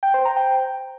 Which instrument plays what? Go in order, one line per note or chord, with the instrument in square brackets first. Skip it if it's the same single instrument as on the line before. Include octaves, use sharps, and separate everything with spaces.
[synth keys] G5
C5
A#5
G5